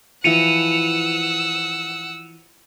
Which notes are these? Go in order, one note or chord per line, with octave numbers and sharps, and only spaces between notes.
E3 F3 F#5 E6 C#7 D#7 F7